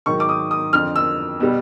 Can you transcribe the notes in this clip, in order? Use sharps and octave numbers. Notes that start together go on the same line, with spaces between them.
G#2 D#3 F#3 C#6
D6
D#6
D#6
F2 D3 F3 F6
E6
B2 G3